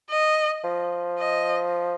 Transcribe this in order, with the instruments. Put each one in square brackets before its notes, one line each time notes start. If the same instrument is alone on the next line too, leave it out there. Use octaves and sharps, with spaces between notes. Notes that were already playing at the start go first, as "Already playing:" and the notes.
[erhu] D#5
[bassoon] F3
[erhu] D#5